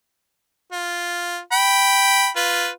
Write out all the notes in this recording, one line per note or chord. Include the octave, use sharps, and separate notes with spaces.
F4
G5 B5
F4 B4